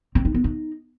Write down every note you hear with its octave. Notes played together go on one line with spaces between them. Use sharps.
C4
D#4
B3
D#4